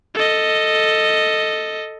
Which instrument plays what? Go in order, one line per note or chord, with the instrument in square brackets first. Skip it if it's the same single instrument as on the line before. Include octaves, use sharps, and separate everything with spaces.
[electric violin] A4 D#5